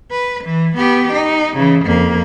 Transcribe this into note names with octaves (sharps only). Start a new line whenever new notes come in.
B4
E3
B3 G4
D#4
C#3 E3
F2 A#3